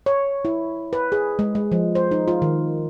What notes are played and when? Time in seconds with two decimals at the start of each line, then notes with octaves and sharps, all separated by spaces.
0.06 C#5
0.45 E4
0.93 B4
1.12 G#4
1.39 G#3
1.55 G#3
1.72 F3
1.95 C5
2.11 D#4
2.28 F4
2.42 D#3